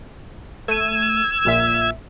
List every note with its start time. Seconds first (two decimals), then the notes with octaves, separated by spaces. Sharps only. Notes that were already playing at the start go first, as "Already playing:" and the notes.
0.68 A3 E6 G#6 D#7
1.45 A#1 A#2 E5